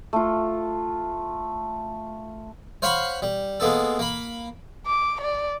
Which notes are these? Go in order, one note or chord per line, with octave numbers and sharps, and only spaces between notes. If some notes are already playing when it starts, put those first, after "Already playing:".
A3 F4
C5 C#5 F5 F#5 B5 C#6
G3
G#3 A#3 B3 A4
A#3 B5
D6
D5